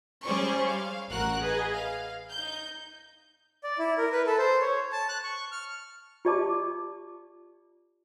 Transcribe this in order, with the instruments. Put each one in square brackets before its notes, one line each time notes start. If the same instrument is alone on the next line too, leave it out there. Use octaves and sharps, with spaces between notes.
[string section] G3 C#4 G#4 C5 D5 C#6
F5
A1 F#4 A#4 F#5 F#6
G#4 B4 D#5
F5
D#4 G6
[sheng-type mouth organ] D5
E4
A#4
B4
A4
C5
C#5
A5
F#6
C#6
F6
[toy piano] F4 G4 D5 D#5 A5 D6